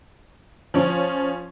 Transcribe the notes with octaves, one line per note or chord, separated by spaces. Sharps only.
F3 C#4